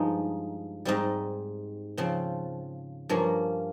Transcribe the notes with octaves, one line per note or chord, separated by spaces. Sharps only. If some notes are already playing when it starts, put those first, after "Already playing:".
Already playing: G2 F3 G#3 D#4
G#2 G3 C4 D#4
C#3 F3 C4
G2 F3 A#3 C#4